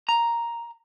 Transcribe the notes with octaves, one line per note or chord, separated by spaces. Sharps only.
A#5